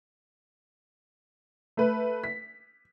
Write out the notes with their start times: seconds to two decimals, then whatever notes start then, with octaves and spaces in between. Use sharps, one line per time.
1.77 A3 B4
2.24 B6